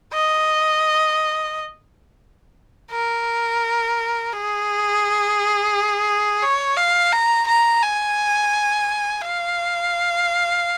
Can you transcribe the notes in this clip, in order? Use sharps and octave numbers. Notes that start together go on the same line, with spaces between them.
D#5
A#4
G#4
C#5
F5
A#5
A#5
G#5
F5